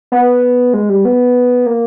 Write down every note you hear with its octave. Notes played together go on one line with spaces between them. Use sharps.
B3
G#3
G3
B3
A#3